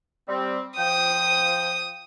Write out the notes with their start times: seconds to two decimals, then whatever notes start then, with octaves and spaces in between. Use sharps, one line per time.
0.29 G3 C4
0.78 F3 G5 D#6